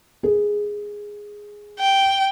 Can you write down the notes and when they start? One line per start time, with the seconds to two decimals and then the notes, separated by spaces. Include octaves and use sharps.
0.23 G#4
1.79 G5